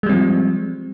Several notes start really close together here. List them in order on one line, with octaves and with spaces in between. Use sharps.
G#3 G3 C4 F3